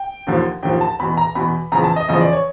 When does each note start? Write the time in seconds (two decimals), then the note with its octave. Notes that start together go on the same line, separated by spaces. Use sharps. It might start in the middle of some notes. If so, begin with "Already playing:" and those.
Already playing: G5
0.27 D#2 D3 F3
0.63 D#2 D3 F3 G5
0.81 A5
0.99 E2 B2 B5
1.17 A#5
1.35 E2 B2 B5
1.72 E2 C#3 F3 A#5
1.84 A5
1.96 D#5
2.08 E2 C#3 F3 D#5
2.21 D5
2.33 C#5